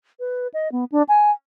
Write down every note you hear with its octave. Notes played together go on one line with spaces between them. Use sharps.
B4
D#5
B3
D4
G#5